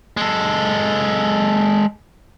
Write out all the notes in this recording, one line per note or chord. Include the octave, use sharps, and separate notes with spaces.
G#3 A4